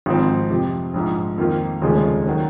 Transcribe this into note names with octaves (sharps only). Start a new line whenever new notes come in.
G#1 G#2 F3 C4
F2 C3 F3
A#1 G#2 F3
F2 D#3 A#3 F4
F1 D#2 C#3 F3 G#3
D#3 F#3